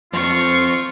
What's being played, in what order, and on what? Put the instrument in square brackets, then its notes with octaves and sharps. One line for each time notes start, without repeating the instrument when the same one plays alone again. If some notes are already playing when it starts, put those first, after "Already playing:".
[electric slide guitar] F2 [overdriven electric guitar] F3 C4 [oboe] F4 [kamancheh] C#6